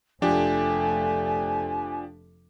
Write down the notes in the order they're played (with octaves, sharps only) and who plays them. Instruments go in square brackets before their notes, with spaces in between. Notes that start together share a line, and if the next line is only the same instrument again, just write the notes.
[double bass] F1 A3 [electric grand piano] F3 D4 G4 [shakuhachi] G#5